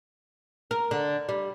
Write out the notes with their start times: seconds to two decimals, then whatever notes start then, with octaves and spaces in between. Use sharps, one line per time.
0.71 A#4
0.91 D3
1.29 G3